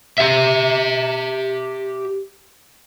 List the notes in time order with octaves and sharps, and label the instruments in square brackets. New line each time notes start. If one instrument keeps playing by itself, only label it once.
[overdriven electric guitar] G4 E5